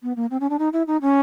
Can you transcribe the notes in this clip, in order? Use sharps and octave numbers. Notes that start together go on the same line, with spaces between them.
B3
A#3
C4
C#4
D4
D#4
E4
D#4
C#4